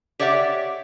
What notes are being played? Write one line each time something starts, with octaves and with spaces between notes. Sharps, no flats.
G4 C#5 D5 E5 F#5